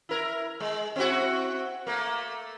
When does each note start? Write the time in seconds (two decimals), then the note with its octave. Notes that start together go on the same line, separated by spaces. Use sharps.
0.09 E4 A#4
0.60 G#3
0.96 C4 E4 F#4
1.87 A3 A#3